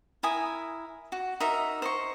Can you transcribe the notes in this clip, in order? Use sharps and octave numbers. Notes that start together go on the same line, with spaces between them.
E4 A#4 G#5 D#6
F#4
D#4 F#4 A#4 E5
C5 D#5 C#6